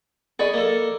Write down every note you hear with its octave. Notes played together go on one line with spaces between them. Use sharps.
G#4 D5 D#5 B5 C#6
A#3 A4